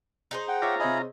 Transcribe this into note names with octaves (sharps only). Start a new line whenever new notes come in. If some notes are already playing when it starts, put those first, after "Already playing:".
D#4 G#4 C5
F#5 G5
F4 C#5 E5 A#5 D6
C3 C#5 D#5 E5 G#5 B5